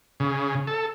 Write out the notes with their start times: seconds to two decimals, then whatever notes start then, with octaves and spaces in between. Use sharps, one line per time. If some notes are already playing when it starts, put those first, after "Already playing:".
0.20 C#3
0.67 A4